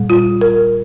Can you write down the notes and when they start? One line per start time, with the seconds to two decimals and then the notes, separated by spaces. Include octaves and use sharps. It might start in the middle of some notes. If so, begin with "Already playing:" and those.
Already playing: A#2 G3
0.10 F4
0.41 A#4